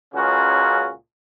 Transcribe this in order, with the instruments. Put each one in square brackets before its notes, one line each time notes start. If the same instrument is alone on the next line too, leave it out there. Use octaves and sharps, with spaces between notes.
[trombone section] C#2 A#2 C#3 C#4 F#4